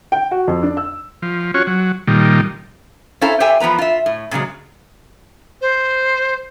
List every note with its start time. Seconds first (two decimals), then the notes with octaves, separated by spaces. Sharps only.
0.12 G5
0.31 F#4
0.48 F2
0.63 D4
0.77 E6
1.22 F3
1.54 C#4 F4 F#4 C#5
1.67 F#3
2.07 A#2 D#3 G3
3.21 C#4 E4 A4 C5 F5 A#5
3.40 G4 A4 C5 E5 G5 G#5
3.60 E2 F3 B3 B4 A#5
3.78 F4 E5
4.06 A2
4.31 A#2 C#3 F#3 G#3
5.62 C5